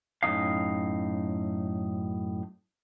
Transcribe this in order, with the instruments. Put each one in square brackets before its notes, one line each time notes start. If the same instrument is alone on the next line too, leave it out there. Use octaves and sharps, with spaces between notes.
[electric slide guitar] F#2 A2 B3 D#4 F5